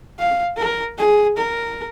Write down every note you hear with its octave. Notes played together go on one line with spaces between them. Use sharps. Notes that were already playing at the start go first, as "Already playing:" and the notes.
F5
A#4
G#4
A#4